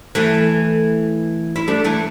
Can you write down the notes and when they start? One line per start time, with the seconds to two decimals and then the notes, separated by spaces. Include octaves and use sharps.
0.15 E3 A3
1.56 E4
1.68 A3 D4
1.84 E3 A3